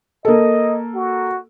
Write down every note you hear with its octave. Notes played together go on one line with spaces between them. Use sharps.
A#3 A4 D#5
F#4